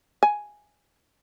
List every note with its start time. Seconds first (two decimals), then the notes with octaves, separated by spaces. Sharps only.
0.23 G#5